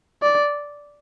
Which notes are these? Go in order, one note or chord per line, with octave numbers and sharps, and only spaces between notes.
D5